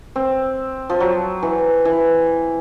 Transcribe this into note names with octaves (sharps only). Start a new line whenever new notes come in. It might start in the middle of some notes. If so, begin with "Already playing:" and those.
C4
F3
F#3
E3
E3